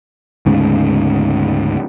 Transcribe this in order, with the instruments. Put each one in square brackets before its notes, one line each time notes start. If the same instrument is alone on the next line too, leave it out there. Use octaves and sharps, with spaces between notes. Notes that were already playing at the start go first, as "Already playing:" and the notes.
[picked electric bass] D2 G#2 C#3